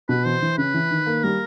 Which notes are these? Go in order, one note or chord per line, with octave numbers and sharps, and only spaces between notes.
B2 B4
E3 C5
E3
C#3 B4
E3
D#3
A#3
G3 A#4